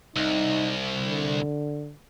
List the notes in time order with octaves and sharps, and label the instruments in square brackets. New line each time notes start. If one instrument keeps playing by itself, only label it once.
[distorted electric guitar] C2 [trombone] D#4
[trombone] D3